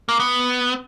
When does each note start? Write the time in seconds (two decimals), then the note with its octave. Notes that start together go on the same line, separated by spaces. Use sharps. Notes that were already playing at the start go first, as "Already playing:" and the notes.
0.09 A#3
0.20 B3